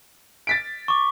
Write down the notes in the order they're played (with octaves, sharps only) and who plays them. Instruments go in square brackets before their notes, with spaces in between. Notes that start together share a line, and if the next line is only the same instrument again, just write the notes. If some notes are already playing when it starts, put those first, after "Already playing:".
[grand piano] A6 B6 D7
[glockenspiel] C#6 D6